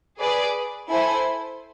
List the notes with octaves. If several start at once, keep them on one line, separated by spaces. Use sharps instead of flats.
G#4 B4 D5
E4 A4 C5 G#5